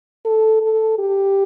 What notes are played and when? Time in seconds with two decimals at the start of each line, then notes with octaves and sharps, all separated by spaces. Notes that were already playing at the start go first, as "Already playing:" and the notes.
0.25 A4
0.61 A4
0.99 G4